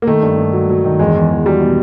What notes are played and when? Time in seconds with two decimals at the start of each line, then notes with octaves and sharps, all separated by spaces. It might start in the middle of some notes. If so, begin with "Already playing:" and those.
0.02 A#3
0.07 D#3 A3
0.22 G2
0.38 G2
0.53 F#3
0.69 F#3
0.84 D#3
0.99 E2 G#3
1.15 E2
1.30 E2
1.45 F#3 G3
1.61 B2